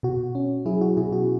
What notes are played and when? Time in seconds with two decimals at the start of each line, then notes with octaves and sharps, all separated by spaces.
0.03 B2 F#4
0.35 C#4
0.66 F#3 E4 G#4
0.81 F#4
0.97 B2 E4 G#4
1.13 F#4